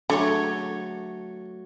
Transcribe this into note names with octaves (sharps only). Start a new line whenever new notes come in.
D3 F#3 A3 C#5